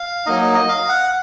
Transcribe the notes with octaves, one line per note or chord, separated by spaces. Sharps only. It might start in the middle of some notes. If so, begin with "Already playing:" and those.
Already playing: F5
F#3 A#3 D#4 D#5
D#5
F5
F#5